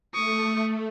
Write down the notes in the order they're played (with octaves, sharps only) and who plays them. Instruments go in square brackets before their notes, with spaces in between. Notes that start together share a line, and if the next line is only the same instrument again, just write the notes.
[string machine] A3 [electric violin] C#6 D#6